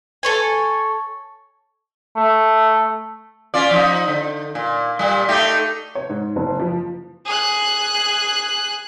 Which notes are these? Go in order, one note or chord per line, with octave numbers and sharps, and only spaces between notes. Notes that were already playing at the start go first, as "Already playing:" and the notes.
A4 C#5 G#5
A3
C#4 F4 D5
F3 D#4
D3
A#2
A#2 G3
A3 D#4 G4
C#5
G#2
F#1
F3
G#4 F#6